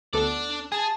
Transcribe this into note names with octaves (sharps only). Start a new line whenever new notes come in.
D2 B3 D4 A4 D5
G#4 G#5 A5